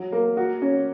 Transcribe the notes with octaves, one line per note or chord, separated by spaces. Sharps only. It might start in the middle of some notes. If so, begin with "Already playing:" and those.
Already playing: F#3
A#3
F#4
C#4